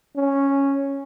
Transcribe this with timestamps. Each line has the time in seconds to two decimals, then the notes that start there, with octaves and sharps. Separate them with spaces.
0.17 C#4